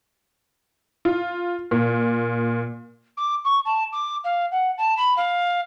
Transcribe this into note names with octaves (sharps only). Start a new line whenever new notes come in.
F4
A#2
D6
C#6
A5
D6
F5
F#5
A5
B5
F5